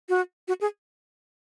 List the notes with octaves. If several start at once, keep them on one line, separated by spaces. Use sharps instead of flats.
F#4
F#4
G#4